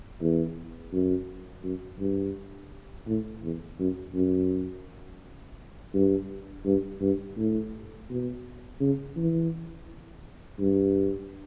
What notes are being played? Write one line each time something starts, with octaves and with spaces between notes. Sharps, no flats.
E2
F#2
F#2
G2
A2
E2
F#2
F#2
G2
G2
G2
A2
B2
C#3
E3
G2